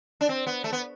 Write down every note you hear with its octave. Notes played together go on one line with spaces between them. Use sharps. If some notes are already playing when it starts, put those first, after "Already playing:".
D4
C4
B3
A3
B3